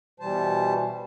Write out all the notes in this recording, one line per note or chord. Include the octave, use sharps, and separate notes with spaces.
B2 E3 G3 C5 A5